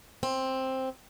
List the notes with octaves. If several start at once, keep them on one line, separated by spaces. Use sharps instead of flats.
C4